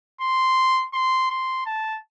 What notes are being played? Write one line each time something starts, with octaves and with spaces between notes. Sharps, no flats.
C6
C6
C6
A5